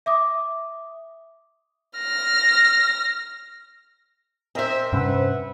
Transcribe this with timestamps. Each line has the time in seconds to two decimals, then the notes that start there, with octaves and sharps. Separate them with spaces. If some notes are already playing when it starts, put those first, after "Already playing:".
0.06 E5 D6 D#6
1.99 F6 A#6
4.55 C4 A#4 C5 D#5 E5
4.93 G2 C3 C#4 B4 E5 F#5